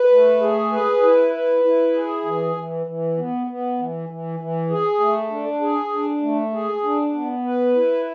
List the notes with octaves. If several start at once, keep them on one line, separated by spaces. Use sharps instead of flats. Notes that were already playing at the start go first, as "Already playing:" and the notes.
Already playing: B4
A3
G#4
B4
E4
B4
E4
G#4
E3
E3
E3
B3
B3
E3
E3
E3
G#4
A3
D4
G#4
D4
A3
G#4
D4
B3
B4
E4